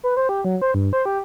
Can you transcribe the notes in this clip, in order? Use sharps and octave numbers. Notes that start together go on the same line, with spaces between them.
B4
C5
G4
F#3
C5
G2
C5
G4